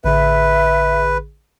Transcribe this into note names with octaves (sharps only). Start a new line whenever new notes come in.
A1 D3 G#4 B4 E5